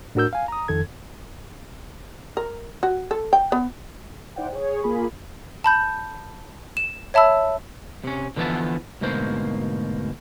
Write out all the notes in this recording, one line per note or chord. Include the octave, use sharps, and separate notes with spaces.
A2 D4 F#4 A#4 E6 G6
F5 G#5
A#5 D#6
F2 D#3 A4 G#6
A#4
F#4
A4
G5
B3
D#4 E4 C5 D5 F#5 G5
G#4 C#5
A#3 F4 G#4 B5
A5 B5 G6
E7
C#5 E5 A5 B5 E6
C3 C#4
D3 E3 F3 B3 E5 A5
D2 G#2 B2 A#3 C5